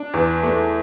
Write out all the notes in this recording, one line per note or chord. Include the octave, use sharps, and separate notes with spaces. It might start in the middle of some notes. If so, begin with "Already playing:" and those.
Already playing: D4
E2
A3